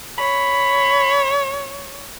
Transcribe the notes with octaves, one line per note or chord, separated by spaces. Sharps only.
C#5 B5